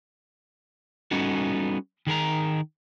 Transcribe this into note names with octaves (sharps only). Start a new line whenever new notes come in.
G3 B3 C#4 D#4 F#4 A4
D#3 G#4 A#4 A#5